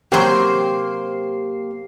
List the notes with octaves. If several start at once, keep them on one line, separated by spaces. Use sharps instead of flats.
C3 F#3 A#3 G4 C5 G5 C7